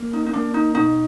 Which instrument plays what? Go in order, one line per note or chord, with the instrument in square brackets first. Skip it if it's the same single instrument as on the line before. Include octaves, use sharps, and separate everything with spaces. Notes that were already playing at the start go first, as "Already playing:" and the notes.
Already playing: [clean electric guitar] A#3
[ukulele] D#4
D#4
[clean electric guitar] A#3 [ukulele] D4
[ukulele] D#4
[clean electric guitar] B2 [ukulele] D#4